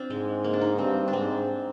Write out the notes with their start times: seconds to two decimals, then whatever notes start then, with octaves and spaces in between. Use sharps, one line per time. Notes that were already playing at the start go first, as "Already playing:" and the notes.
Already playing: C4 D4 F4
0.10 G#2 G#3
0.44 A#3
0.53 D4
0.61 D#4
0.78 G2 C4
1.08 D4
1.13 G#2 C4